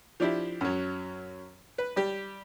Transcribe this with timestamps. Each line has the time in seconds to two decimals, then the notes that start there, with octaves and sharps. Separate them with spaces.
0.20 F3 D4 E4 G4
0.61 F#2 F#3
1.78 B4
1.96 G3 G4